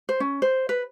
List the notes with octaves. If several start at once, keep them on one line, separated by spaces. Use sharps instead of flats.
C5
C#4
C5
B4